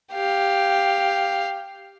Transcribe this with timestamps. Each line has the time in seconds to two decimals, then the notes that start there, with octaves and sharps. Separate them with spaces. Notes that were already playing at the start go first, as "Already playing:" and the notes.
0.13 G4 F5